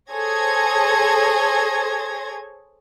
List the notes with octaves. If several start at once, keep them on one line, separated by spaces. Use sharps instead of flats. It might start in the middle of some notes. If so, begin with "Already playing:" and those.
G#4 A4 C5 C#5 G#6 A#6